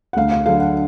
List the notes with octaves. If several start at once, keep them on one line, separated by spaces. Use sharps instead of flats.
F#5
D2 F5
F5
D3 F#3 F5
F#5